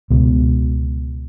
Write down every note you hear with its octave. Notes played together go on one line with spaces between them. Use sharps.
C#2 B2